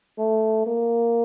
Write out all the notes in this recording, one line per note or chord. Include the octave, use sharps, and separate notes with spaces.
A3
A#3